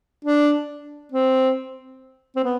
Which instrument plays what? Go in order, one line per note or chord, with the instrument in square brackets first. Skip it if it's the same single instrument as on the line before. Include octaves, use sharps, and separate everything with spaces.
[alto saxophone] D4
C4
C4
B3